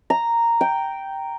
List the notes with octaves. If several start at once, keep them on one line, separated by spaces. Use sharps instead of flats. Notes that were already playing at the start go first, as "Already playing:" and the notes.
A#5
G5